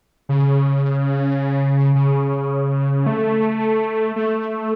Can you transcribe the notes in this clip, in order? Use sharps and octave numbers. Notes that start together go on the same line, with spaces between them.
C#3
C#3
A3
A3